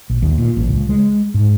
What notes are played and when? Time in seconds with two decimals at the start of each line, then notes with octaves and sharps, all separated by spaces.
0.10 A#1
0.22 D#2
0.38 A#2
0.57 A1
0.69 C#2
0.89 G#3
1.34 G#2